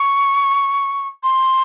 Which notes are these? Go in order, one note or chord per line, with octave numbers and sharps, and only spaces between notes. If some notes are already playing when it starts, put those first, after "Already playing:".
Already playing: C#6
C6